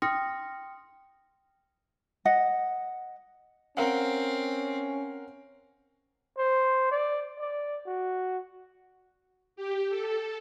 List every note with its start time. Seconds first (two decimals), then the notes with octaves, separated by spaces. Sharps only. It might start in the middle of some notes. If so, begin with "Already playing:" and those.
0.02 G5 C6 D#6 F6 A#6 C#7
2.25 D#5 F#5
3.77 C4 C#4 A#4 F5 F#5
6.38 C5
6.92 D5
7.40 D5
7.86 F#4
9.56 G4
9.90 A4